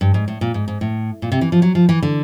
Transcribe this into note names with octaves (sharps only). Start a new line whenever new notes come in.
G2
G#2
A2
A#2
G#2
G#2
A2
A#2
C3
E3
F3
F#3
F3
E3
D3